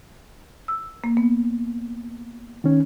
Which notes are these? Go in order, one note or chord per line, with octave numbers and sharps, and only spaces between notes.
E6
A#3
B3
D#3 C#4